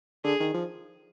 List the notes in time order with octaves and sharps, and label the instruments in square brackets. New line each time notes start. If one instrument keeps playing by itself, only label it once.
[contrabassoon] D3 [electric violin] G#4
[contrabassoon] D#3
F3